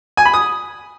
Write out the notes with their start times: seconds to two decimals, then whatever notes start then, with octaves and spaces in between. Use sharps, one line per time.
0.17 G#5
0.25 B5
0.34 D#6